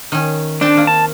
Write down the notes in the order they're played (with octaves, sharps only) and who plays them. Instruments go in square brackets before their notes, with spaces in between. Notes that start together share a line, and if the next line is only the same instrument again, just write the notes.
[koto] D#3 C#4
[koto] C4 G5 A5 [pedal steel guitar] D4
[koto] D#3 A#3
[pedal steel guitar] A5